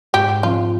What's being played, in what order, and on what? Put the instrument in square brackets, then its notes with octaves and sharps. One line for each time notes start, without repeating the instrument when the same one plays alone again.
[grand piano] G#2 [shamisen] G4
[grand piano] F3 C4 [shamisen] F4